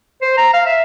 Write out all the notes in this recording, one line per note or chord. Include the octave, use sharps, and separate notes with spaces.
C5
A#5
F5
E5